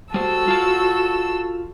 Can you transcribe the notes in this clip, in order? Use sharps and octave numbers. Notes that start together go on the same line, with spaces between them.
G3 F#4 A4 C5 E6
F4 A5